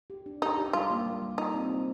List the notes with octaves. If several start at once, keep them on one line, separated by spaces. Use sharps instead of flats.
G4
D4
D#4 G4
G4
G3 F4
A#3
G3
G3
D#4 F4
C4
G3